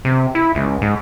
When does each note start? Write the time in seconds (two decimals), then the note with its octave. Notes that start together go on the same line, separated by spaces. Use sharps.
0.05 C3
0.35 E4
0.55 C#2
0.82 G#2